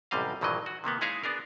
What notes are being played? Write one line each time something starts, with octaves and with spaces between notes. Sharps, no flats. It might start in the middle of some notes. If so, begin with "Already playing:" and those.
A1 F#2 C3 G3 D#5 F5
A#1 G2 D#3 E3 F#3 D#5
F#4
C3 D#3 A#3 B3
G#3 D#4 E4 G#4 C#5 F5
B3 D4 G#4 A#4